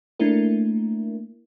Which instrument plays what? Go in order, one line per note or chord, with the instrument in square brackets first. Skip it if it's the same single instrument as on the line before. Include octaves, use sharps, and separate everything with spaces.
[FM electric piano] A3 A#3 D4 E4 A#4